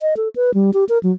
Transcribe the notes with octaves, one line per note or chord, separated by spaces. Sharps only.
D#5
A4
B4
G3
G4
A#4
F#3